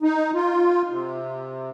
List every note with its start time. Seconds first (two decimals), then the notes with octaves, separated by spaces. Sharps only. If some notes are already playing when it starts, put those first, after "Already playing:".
0.03 D#4
0.35 F4
0.90 C3